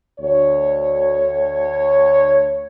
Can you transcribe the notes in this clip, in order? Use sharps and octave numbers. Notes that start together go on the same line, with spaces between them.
D2 C#5